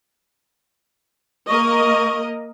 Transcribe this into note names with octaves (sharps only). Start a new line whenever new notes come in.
A#3 A#4 D#5 C#6